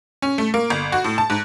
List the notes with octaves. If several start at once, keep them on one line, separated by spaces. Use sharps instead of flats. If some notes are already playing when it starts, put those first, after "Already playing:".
C#4
A3
A#3
G1
F#4
A2
A5
G#2